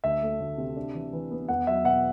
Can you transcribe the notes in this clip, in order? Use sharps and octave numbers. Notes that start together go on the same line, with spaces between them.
D2 E5
A3
D2
C3
D4
E3
E3
B3
E2 F#5
F#3 E5
B2 F#5